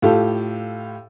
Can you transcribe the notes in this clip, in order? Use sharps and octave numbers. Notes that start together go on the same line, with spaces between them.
A2 F4 G4 A4